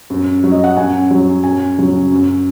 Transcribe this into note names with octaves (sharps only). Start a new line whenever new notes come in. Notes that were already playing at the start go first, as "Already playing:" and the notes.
F#2
F#3
D#5
F#5
F#2 G#5
F#3
F#2 G#5
C#3 F#3
F#2